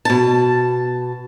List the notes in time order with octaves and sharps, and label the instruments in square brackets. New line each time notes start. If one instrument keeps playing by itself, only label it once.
[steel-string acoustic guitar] B2 A5